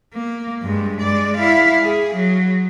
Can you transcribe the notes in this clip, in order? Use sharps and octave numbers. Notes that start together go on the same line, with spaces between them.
A#3
G2 G#3
G#3 D5
E4 F5
G#4
F#3